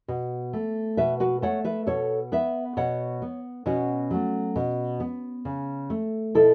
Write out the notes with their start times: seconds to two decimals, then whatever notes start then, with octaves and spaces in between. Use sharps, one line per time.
0.08 B2
0.53 A3
0.97 B2 B4 E5
1.20 F#4 B4
1.42 A3 C#5 F#5
1.65 B4 E5
1.87 B2 A4 C#5
2.32 B3 B4 E5
2.77 B2 C#5 F#5
3.22 B3
3.66 B2 C#4 F#4
4.11 F#3 A3
4.56 B2
5.00 B3
5.45 C#3
5.90 A3
6.35 B2 E4 A4